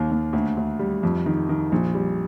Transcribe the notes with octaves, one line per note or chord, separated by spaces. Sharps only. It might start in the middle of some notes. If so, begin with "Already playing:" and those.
Already playing: D#2 D#3
D#2
D2
D2
G3
F2
D#3
D#3
A#1
G3